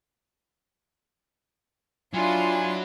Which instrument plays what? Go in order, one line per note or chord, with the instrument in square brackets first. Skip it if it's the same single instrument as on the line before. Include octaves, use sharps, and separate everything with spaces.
[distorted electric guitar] F#3 [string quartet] D4 E4 C6 [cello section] F4 [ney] G#5